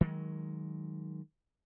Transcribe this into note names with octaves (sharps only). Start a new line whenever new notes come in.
D#3 F#3 G#3